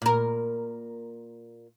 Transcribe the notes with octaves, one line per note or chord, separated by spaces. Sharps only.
A#2 A#4